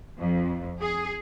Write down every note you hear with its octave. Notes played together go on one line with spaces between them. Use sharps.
F2
G#4